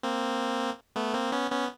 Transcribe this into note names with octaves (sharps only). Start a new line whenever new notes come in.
A#3 C4
A3 B3
A#3 C4
B3 C#4
B3 C#4